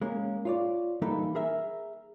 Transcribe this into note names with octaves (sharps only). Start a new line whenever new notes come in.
G#3 A#3 C#4
F4 C#5 D5
E3 G3 A#3 D#4 A4 B4
G#4 A#4 E5